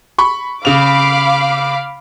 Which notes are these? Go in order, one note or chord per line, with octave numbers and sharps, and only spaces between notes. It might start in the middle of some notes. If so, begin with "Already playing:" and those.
B5 C#6
C#3 F5 B5 D6 F7